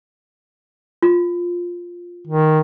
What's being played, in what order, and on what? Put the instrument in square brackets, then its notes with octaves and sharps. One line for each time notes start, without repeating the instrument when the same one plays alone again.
[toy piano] F4
[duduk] D#3